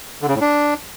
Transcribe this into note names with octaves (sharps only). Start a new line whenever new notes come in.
D3
C#3
A2
D4